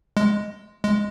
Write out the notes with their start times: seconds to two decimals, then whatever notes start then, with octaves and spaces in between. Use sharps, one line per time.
0.17 G#3
0.83 G#3